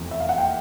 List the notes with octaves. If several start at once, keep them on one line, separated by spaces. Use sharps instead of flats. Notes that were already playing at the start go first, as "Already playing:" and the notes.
Already playing: F1 E2 C3 E3
E5
F5
F#5
G5